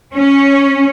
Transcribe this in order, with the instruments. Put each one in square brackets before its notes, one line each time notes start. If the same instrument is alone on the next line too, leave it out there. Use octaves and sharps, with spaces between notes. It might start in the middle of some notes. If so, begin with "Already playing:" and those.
[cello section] C#4